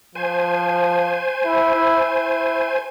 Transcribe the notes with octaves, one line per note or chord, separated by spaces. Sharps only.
F3 C5 G#5
E4
E4
E4